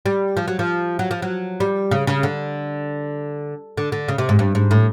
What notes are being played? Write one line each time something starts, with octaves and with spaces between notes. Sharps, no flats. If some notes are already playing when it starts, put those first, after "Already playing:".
G3
F3
F#3
F3
F#3
F3
F#3
G3
C#3
C#3
D3
D3
D3
C#3
C3
G#2
G2
G#2
A2